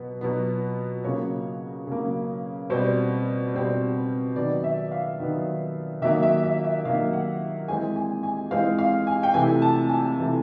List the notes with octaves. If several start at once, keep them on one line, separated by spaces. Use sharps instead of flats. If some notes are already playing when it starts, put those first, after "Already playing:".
Already playing: B2 F#3 B3
B2 F#3 B3
C#3 F#3 A#3 C#5
C#3 F#3 A#3
B2 G3 C4 C5
B2 G3 C4
D#3 F#3 B3 D5
E5
F5
D#3 F#3 B3
D#3 F#3 A#3 E5
E5
E5
E5
D#3 F#3 A#3 F5
F#5
E3 G#3 C4 G#5
G#5
G#5
E3 G#3 C4 F5
F5
G#5
G5
C3 E3 A3 G#5
A5
G#5
C3 E3 A3